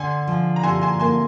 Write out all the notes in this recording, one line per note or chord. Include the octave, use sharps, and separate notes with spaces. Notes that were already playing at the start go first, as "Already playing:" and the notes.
Already playing: D3 G#5 C6
F3
A#5
D3 G#5 C6
G#5 C6
A#3 G#5 C6